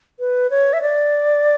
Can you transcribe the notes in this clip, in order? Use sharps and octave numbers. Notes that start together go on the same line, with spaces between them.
B4
C#5
E5
D5